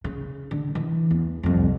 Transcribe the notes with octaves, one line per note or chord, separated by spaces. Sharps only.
C#3
D3
E3
E2
C2 F2